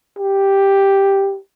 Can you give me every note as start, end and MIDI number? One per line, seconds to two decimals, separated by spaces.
0.19 1.37 67